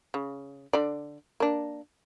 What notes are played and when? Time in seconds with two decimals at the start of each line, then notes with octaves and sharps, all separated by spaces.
0.14 C#3
0.73 D3 D5
1.40 A#3 D4